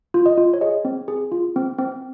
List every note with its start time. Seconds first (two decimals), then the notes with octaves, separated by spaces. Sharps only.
0.14 F4
0.26 D#5
0.37 F4
0.54 C#5
0.61 G#4 D#5
0.85 C4
1.08 G#4
1.32 F4
1.56 C4
1.78 C4